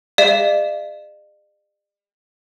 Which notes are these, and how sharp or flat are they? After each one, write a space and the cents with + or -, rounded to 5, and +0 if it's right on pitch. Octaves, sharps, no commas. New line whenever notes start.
G#4 -40 D5 +45 F5 -35